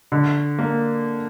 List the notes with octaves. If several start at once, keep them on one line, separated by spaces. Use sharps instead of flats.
D3
A#3